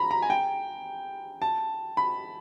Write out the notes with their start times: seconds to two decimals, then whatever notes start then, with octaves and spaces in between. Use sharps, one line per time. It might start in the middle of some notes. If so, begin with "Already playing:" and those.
Already playing: A#5 B5
0.11 A#5
0.22 G#5
0.30 G5
1.42 A5
1.97 B5